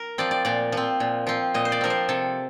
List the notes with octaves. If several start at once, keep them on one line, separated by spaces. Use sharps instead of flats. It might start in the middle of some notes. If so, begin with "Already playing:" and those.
Already playing: A#4
F3 C4 D5
D5
A#2 D5
F3 C4
A#2
F3 C4
A#2 D#5
C5
D5
F3 C4 A#4
C5
C3 A4